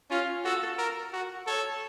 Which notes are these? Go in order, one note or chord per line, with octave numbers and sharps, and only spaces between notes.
C#4 F4
F#4 A4
A#4
F#4
A4 C#5